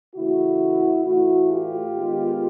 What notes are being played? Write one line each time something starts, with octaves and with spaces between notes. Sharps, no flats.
C#3 E3 A3 E4 F#4
A2 E3 A3 E4 F#4
F4 G4
D#3 G#3 B3